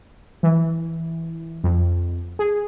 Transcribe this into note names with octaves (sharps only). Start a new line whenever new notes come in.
E3
F2
G#4